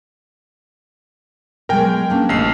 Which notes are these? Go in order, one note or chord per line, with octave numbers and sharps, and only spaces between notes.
B2 F#3 G#3 A#4 G5 G#5
A#3 C#4 D4
A1 C#3 D4 C7